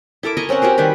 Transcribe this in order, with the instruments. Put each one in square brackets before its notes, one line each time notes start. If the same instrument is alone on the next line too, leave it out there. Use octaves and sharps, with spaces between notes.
[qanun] E4 A4 A#4 D6
D#5 G#5 A#5 C#6
C4 C#4 A#4 F#5
F#4 G4 A#4 C5
D#3 G3 G4 B4